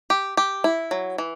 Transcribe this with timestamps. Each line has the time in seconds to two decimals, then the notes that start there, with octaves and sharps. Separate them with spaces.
0.10 G4
0.37 G4
0.64 E4
0.91 F#3
1.18 E3